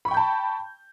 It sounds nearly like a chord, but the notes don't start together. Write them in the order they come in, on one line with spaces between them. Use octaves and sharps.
B5 C#6 G5 G6 A5